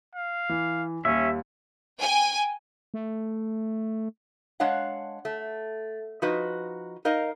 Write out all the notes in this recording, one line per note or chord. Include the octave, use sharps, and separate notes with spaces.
F5
E3
D#2 G3 C#4 E5
G5 G#5
A3
G#3 D4 C#5 F5 F#5
A3
F3 D#4 F#4 B4 D#5
D#4 A#4 D#5 F5